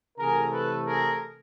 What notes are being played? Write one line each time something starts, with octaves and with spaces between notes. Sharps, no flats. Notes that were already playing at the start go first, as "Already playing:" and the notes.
C3 E3 A3 G#4 A#4
A4 B4
G#4 A#4